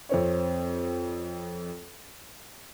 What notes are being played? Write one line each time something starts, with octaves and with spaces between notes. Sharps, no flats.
F2 C4 C#5